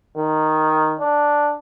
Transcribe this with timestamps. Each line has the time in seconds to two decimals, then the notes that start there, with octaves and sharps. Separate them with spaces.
0.17 D#3
1.00 D4